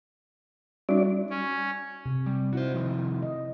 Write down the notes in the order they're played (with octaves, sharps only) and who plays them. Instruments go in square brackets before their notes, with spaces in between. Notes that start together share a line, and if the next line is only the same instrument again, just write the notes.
[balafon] G3 D#4 [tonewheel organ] C#4 F#4 D5
[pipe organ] C#4
[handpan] C3
[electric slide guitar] G3
[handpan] D#4 E4 [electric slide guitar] F#4 C5
[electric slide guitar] C3 D#3 F3
[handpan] D#5